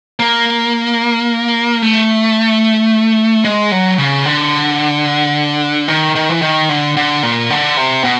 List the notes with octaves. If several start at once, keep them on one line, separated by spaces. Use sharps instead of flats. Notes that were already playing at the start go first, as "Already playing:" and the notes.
A#3
A3
G#3
F#3
C#3
D3
D#3
D#3
E3
D#3
D3
D3
A#2
D3
C3
B2